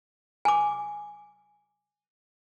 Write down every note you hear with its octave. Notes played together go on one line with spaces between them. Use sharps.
G#5 D6